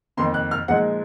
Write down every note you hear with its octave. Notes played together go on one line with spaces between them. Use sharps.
F2 D#3 A#3 C6
F#6
F6
A#2 F3 G#3 D#4 F#5